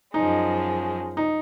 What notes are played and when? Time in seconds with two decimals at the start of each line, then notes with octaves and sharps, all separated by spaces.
0.14 F#2 F3 G#3 D#4
1.17 D#4